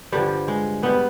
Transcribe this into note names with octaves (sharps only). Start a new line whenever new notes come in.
G2 D3 F3 G3
G#3
G#2 G3 B3